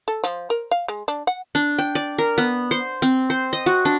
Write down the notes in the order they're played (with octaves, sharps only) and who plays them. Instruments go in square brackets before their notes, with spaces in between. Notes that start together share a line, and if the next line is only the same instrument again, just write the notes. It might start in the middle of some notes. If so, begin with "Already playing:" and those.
[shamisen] A4
F3
A#4
F5
G#3
D4
F#5
[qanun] D4
G5
D5
A#4
B3
C5
C4
C5
D#5
F#4
D4